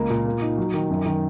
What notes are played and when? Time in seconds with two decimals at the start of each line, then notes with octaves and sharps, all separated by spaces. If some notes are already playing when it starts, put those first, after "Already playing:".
Already playing: C#2 A#3
0.10 A#2
0.26 A#3
0.42 D#4
0.57 F#3
0.74 D#3
0.90 F#2
1.06 D#3